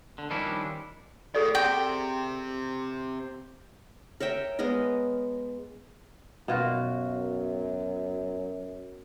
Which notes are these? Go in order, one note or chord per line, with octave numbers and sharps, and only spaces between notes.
D3
D#3 F3 G3 C#4 D4 E4
A2 G#4 A4 D5
C3 G5
A#4 C#5 E5 G5
G#3 B3 A#4 D#5
F#2 B2 F4 F#4